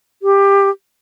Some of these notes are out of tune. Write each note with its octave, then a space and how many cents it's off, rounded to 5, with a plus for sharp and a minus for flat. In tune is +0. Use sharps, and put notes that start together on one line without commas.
G4 +20